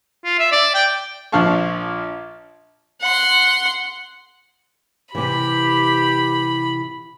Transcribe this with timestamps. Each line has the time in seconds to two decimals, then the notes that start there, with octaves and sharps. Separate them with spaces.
0.25 F4
0.39 E5
0.52 D5
0.75 G5
1.32 A#1 F3 D4 F5 A5 C#6
3.01 F#5 C6
5.15 C3 E3 G4 B5